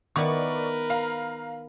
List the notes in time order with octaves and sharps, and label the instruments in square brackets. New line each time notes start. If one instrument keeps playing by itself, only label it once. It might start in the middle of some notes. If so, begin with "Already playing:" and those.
[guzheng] D#3 B3 E4 [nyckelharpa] A#4 B4 [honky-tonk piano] D5 C#6
[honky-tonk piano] F5 A#5